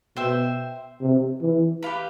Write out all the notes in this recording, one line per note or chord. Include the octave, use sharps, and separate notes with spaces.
B2 C5 E5 G5
C3
E3
G4 B4 F5 B5